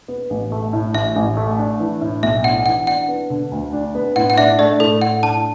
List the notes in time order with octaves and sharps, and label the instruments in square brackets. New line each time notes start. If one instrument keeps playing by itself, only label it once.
[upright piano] B3
A1
A3
A2
[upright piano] A1 [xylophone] E5
[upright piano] A1
A3
D4
E3
A2
[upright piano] B1 [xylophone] E5
[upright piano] D4 [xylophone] F#5
[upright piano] E3 [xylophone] F#5
[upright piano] D4 [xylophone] F#5
[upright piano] B3
D3
D2
D4
B3
[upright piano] A2 [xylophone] F#5
[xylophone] F#5
[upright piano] D4 [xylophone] E5
[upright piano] A3 [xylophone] D5
[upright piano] A2 [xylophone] A4
[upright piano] A2 [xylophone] F#5
[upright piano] D4 [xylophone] A5